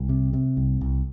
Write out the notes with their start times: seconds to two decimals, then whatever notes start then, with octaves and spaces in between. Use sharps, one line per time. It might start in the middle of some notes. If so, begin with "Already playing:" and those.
Already playing: C2
0.09 C3
0.33 C3
0.57 C2
0.81 C2